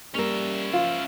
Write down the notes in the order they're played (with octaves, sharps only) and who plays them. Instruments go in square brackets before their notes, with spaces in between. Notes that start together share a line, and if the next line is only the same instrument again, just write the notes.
[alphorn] G3 [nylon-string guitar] A#3 A#4 [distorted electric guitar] C#4 E5
[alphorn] F3 [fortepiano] F4